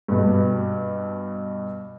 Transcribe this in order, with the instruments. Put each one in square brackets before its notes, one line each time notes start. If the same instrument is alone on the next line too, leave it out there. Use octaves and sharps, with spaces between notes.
[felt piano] G2 B2